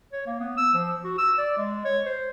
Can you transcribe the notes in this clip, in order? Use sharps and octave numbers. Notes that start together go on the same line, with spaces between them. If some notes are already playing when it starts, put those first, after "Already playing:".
C#5
A#3
B3
E6
F3
F#4
E6
D5
G#3
C#5
C5